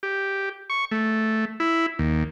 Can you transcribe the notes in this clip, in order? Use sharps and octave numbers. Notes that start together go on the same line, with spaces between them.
G4
C#6
A3
E4
D#2